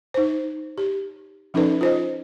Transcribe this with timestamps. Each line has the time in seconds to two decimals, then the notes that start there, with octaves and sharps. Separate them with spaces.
0.14 D#4 C5
0.78 G4
1.54 F3 C#4 D#4 A4 B4 D5
1.81 F4 C5 D#5